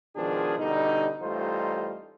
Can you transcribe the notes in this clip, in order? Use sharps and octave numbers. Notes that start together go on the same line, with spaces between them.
B2 D#3 F3 G#3 D4 G#4
B2 D3 G3 D#4
A1 G3 A3 D#4 F4 C5